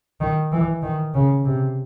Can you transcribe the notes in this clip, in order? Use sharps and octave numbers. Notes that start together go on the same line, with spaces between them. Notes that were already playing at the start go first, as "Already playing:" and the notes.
D#3
E3
D#3
C#3
C3